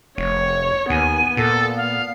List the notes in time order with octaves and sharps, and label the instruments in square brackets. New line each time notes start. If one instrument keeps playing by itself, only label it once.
[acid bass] F1 [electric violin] C#5
[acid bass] D#2 [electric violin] B3 [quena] G#5
[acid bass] A#2 [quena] A4
[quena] F5